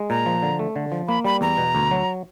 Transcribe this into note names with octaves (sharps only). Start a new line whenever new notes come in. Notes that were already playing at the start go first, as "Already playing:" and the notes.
Already playing: G#3
A#2 A#5
F3
D3
A3
D3
F3
A#3 B5
G3 B5
E2 A#5
B2
D2
F#3